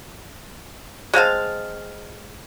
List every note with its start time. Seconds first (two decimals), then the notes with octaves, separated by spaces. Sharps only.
1.14 G#3 C4 F5 A5